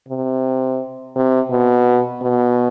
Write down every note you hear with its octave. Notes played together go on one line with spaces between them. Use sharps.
C3
C3
B2
B2